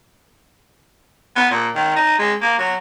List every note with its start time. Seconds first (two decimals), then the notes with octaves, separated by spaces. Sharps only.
1.36 B3
1.50 A#2
1.75 D#3
1.95 D#4
2.18 G#3
2.41 A#3
2.58 F#3